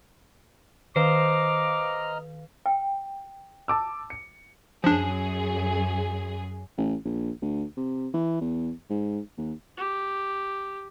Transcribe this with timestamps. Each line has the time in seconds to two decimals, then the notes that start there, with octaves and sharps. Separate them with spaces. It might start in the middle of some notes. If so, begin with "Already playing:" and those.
0.96 D#3 B4 C5 D#5 F5 A#5 D6 F6
2.66 G5
3.68 A5 D6 E6
4.10 C#7
4.84 F#2 F3 D4 G#4
6.78 A1
7.05 A#1
7.42 D2
7.77 C3
8.14 E3
8.41 E2
8.90 G#2
9.38 D#2
9.77 G4